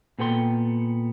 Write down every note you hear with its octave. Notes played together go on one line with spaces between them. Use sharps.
A#2 B3 A4 G5 C6